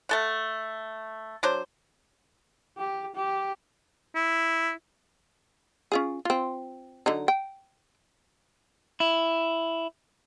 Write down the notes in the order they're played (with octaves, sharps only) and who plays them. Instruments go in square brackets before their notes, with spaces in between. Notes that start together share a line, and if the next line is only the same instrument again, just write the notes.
[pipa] A3 A4 F#5
F#3 D4 C5
[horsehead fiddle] G4
G4
[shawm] E4
[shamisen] C#4 F4 G#4
C4 F4
D3 F#3 D#4
G5
[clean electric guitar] E4